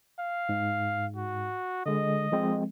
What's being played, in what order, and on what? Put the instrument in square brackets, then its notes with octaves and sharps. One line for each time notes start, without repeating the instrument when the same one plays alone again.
[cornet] F5
[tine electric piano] G#2
[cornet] F#4
[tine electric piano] D3 G#3 [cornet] D#5
[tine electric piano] F3 G#3 C4